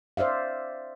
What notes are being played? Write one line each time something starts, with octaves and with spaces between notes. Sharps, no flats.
C5 D5 E5 F5